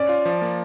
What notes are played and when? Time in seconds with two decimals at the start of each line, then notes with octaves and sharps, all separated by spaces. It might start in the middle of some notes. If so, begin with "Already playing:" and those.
Already playing: C#4 D5
0.09 F4
0.25 F3
0.42 A#3